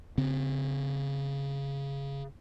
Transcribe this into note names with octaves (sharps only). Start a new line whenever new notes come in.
C#3 C4